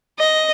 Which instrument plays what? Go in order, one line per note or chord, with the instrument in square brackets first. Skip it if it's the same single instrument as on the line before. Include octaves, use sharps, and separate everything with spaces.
[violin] D#5